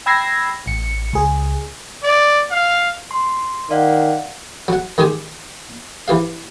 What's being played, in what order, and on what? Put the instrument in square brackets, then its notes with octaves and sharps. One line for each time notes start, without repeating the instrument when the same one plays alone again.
[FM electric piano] G5 B5 E6 G#6 A#6 C7
A1 C#7
C#2 G#4
[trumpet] D5
F5
[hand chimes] C6
[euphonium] D#3 [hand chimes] D5 F5 F#5
[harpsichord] F#3 F#5
D#3 G#3 G4 G#5 D#6
E3 G4 F5